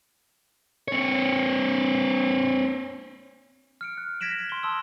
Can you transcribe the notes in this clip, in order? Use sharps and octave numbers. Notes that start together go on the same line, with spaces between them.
C4 C#5
F6 C#7 D7
F#6
G#6 A#6 B6 D7 E7 F#7
C6 G7
A5 C6 D#6 E6